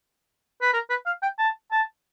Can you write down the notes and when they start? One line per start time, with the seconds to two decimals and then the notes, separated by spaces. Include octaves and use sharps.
0.61 B4
0.73 A#4
0.90 B4
1.06 F5
1.22 G5
1.38 A5
1.71 A5